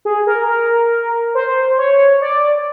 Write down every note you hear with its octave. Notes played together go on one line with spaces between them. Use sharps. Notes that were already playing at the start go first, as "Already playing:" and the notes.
G#4
A#4
A#4
C5
C#5
D5